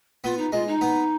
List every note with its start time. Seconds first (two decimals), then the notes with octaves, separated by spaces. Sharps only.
0.24 B3 F4
0.38 D#4
0.52 G#3 F4
0.67 D#4
0.81 B3